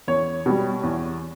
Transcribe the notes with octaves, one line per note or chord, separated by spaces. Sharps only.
E2 C#5
B2 G3
E2